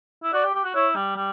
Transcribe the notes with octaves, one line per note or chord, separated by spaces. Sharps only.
E4
F#4 D5
G4
G4
F#4
E4 C#5
G3
G3